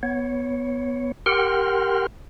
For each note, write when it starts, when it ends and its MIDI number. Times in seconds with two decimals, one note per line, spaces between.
0.03 1.12 59
0.03 1.12 73
1.26 2.07 67
1.26 2.07 70
1.26 2.07 78
1.26 2.07 79
1.26 2.07 84
1.26 2.07 89